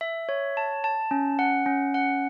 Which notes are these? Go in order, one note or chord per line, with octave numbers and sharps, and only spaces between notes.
E5
C#5
A5
A5
C#4
F#5
C#4
F#5